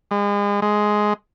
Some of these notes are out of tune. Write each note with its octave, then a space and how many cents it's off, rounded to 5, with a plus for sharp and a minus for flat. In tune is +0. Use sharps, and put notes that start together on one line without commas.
G#3 -35
G#3 +10